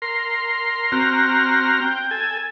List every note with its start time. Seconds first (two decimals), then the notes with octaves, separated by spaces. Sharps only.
0.02 A#4 C6
0.92 C4 F#4 A#5 F6
1.82 G5
2.11 A4 G#5